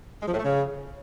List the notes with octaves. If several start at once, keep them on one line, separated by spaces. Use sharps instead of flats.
G#3
F3
A2
A3
C#3